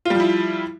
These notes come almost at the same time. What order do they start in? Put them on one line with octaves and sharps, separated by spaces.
F4 G3 F3 E4